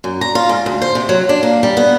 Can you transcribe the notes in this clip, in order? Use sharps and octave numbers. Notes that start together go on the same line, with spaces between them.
F#2
A#5
F4
G#2
D2
C5
C3
F#3
D4
A#3
G3
B3